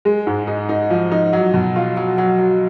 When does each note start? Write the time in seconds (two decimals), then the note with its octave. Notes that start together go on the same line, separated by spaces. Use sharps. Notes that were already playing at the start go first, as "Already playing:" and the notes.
0.05 G#3
0.27 G#2
0.47 D#4
0.69 D#4
0.90 F3
1.12 D#4
1.33 F#3
1.54 B2
1.76 F4
1.97 F#3
2.18 F#3
2.39 F#3